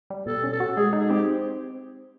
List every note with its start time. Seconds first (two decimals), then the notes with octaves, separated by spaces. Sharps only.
0.10 G3
0.26 B2 A4
0.44 C#4
0.52 A4
0.60 F#4
0.77 G#3 G#4
0.93 D#4
0.99 G#4
1.10 C4 G4